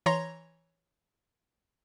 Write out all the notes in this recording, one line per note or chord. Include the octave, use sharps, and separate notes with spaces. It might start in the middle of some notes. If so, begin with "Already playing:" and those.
E3 C#5 A#5 C6 A#6